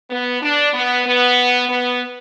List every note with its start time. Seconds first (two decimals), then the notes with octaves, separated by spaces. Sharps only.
0.10 B3
0.42 D4
0.74 B3
1.06 B3
1.69 B3